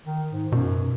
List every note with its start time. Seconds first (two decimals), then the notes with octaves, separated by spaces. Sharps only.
0.06 D#3
0.32 G#2
0.52 F#2 B2